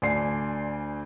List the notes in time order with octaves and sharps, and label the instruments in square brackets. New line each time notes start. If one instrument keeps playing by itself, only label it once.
[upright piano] D2 D4 D5 G#5 C6 C7